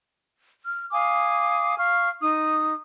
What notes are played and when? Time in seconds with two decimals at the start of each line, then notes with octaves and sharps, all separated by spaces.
0.65 F6
0.92 F5 G#5 D6 D#6
1.78 F5 C#6 F6
2.21 D#4 D#6